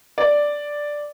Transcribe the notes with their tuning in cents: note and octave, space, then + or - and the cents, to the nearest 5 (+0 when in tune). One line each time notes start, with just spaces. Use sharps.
D5 +0